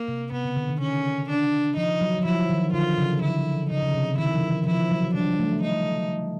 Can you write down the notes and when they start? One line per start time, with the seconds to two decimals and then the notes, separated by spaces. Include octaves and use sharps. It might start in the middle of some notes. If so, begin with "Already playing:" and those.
Already playing: A#3
0.08 C3
0.32 C3 B3
0.45 C#3
0.56 D3
0.68 D#3
0.80 C#4
1.29 D4
1.76 F3 D#4
2.01 F#3
2.18 F#3
2.25 F3 E4
2.49 D#3
2.73 D3 F4
2.98 C#3
3.22 D3 E4
3.70 C#3 D#4
3.83 C#3
3.94 C3
4.18 D#3 E4
4.33 F3
4.42 E3
4.67 F3 E4
4.91 F#3
5.14 G3 D4
5.39 A3
5.62 D#4